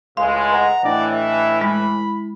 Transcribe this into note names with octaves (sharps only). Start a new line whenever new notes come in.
C#2 A2 G#3 F5 C6
B4 D#5 F#5 A#5
A2 E3 D4 D5 D#5 G5
E5
G#3 E4 B5